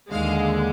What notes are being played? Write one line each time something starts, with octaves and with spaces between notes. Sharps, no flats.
D#2 D3 G#3 F5